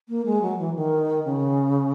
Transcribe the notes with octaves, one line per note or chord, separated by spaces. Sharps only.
A#3
G#3
F#3
E3
D#3
C#3